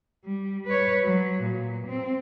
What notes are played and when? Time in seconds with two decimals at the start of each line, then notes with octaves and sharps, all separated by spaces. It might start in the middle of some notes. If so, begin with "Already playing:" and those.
0.25 G3
0.66 B4 C#5
1.04 F#3
1.42 A#2
1.87 C4